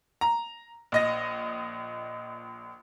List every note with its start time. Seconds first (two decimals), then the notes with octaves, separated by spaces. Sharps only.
0.21 A#5
0.92 A#1 D#5 A#6